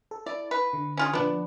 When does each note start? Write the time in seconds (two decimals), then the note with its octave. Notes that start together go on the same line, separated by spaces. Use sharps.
0.11 A4
0.26 E4 D5
0.51 B4
0.73 D3
0.97 C#4 F4 G#4
1.13 A#2 F3 B3 D4